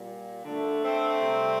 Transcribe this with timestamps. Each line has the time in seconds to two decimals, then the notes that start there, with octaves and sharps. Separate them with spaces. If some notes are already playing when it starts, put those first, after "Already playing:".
Already playing: A#2 G3
0.45 D3 A3
0.84 A3 C4
1.21 C3 G3